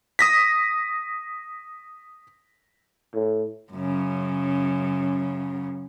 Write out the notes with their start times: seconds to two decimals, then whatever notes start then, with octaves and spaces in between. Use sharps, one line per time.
0.19 D#6 A#6 B6
3.14 A2
3.72 F#2 C#3